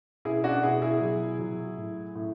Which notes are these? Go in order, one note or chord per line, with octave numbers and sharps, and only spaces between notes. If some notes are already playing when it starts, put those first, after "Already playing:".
B2 E4 G#4
D4 F#4
B2 E4 G#4
E4 G#4
F#3
F#3
A2
A2